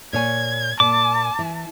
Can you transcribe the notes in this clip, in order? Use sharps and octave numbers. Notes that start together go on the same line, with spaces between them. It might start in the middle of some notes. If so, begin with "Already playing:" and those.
A#2 C#5 G#5 G#6
A#2 A5 D6
E3